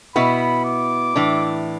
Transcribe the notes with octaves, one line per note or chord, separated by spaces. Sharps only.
B2 B3 E4 B5
D6
A2 E3 D4